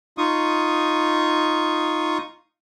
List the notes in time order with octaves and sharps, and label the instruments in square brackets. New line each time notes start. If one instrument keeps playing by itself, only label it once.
[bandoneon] D#4 F4 C#6 D#6